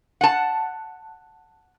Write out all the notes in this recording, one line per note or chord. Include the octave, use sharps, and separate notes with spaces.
F#5 A5